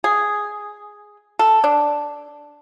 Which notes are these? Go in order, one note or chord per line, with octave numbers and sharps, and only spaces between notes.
G#4
A4
D4